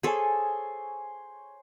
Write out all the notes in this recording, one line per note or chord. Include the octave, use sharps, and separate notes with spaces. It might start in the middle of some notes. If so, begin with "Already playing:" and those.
G#4 A4 C5 C#5 G#5